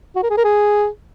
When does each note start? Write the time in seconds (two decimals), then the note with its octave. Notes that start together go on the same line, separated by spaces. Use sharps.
0.16 F#4
0.23 A#4
0.30 G#4
0.37 A#4
0.45 G#4